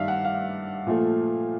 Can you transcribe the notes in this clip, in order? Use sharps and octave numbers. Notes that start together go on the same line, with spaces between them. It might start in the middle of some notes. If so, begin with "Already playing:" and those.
Already playing: G2 D#3 G3 D5 E5 F5
F#5
F5
A#2 F3 A3